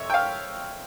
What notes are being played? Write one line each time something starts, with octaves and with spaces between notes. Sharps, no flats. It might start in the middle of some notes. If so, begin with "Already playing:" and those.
Already playing: F2 C3 C#5 E5
G5
F5